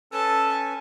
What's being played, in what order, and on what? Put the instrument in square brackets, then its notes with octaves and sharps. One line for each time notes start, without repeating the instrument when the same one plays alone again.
[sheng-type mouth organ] C#4 B4 G#5 [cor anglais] A4 [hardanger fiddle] A5